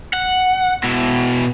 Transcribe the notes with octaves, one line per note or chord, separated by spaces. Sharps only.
F#5
B2 E4